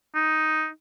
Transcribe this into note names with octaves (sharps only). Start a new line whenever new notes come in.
D#4